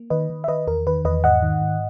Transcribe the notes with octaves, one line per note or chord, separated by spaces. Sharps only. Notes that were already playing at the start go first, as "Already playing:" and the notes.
Already playing: A#3
D#3 B4 D#5
D#3
E5
D#3 B4 D#5
E2 A#4
D#3 B4
E2 B4 D#5
G#2 D#5 F#5
D#3
G#2